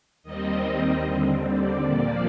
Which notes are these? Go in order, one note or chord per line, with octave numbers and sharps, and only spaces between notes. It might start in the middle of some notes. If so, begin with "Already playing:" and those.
D#2 D#3 G3 C4 D#5
D#2 D3 G3 C4
D5
A#2 F3 A#3